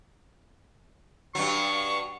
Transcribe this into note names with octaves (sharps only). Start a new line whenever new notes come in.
G2 F#3 C#6